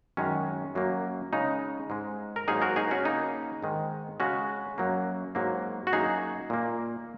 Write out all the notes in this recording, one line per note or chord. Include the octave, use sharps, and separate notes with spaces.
F#2 D#3 G#3 C#4
F#2 F#3 A#3
C#3 G#3 D#4
G#2 G#3
A#4
G#2 F#3 A#3 D#4 G#4
F#4 A#4
D#4 G#4
C#4 F#4
C#3 A#3 D#4
G#2 D#3 G#3
C#3 G#3 C#4 F#4
F#2 F#3 A#3
G#2 F#3 A#3
F#4
F#2 F#3 A#3 D#4 G#4
A#2 A#3